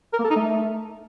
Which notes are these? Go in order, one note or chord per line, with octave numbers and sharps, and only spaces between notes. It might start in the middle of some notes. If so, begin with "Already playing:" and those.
A#4
A#3
A4
D#4
A3